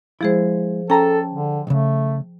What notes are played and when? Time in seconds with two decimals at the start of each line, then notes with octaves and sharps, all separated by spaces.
0.21 F3 G#3 E4 G#4 C5
0.90 C#4 A4 G5 A5 A#5
1.31 D3
1.67 B1 C#3 A3